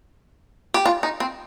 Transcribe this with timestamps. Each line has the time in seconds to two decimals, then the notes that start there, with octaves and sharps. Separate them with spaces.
0.74 G4
0.86 F4
1.03 D#4
1.20 C4